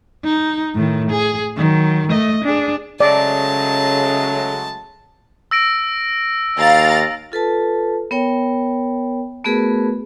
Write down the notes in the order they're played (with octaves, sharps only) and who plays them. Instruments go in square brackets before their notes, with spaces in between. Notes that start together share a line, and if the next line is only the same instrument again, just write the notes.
[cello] D#4
A2 D#3
G#4
D#3 F#3
A3 D#5
D4 G#4
[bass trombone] C#3 [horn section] F#3 G#3 A3 [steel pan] D5 [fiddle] A5
[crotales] E6 A#6 D7
[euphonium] D#2 [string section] F5 A#5 A6
[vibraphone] F4 A4 B4 A5
B3 A#4 C#5 G5
A3 B3 F#4 G#4 A#4 B4